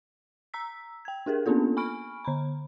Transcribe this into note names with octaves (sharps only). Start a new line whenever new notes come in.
A#5 E6 B6
G5 G#6
D4 G4 G#4 A#4
A#3 B3 C#4 D4 F4 A4
G#5 B5 C#6 F6 D7
D3 A#5 B5